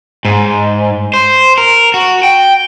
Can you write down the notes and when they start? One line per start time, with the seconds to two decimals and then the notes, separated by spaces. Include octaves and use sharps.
0.25 G#2
1.14 C5
1.58 A#4
1.94 F#4
2.23 G5